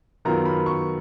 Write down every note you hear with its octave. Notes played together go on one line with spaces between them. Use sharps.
F#2 D#3 F#3 B3 F4 A#5
B5
C#6